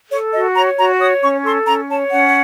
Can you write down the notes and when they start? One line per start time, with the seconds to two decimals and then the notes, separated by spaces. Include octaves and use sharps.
0.10 A4 C#5
0.32 F#4 D#5
0.55 C#5 A#5
0.77 F#4 A#5
1.00 C#5 D#6
1.21 C#4 C#6
1.44 A4 C6
1.66 C#4 A#5
1.89 C#5 A5
2.11 C#4 F#5